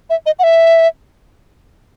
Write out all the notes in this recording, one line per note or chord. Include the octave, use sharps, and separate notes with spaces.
E5
D#5
F#5
E5